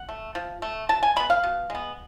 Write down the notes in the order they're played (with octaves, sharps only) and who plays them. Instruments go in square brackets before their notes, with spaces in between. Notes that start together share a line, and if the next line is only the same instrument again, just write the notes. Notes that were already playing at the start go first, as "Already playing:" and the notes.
Already playing: [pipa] F#5
A3
F3
A3
B2 A5
G#5
G#3 B3 B5
F5
B2
G#3 B3